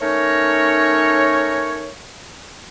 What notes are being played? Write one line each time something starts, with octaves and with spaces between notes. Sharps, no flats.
A3 C#4 D#4 A#4 C#5